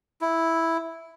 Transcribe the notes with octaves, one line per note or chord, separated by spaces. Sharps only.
E4